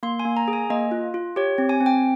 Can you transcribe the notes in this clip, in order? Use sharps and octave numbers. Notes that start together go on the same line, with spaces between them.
A#3 C6
G#5
A#3
A#5
G#4
G#5
A#3 D#5
F4
F4
G4 C#5
C4
G#5
C4
G5